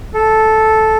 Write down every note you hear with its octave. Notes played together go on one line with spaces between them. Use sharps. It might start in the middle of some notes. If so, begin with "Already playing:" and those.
A4